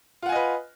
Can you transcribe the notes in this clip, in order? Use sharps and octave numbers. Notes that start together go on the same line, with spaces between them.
F4 B4 D#5 F#5 G#5